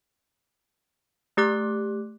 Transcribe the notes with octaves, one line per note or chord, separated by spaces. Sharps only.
A3 G4 D6 F#6